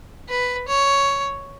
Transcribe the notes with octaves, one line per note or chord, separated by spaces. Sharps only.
B4
C#5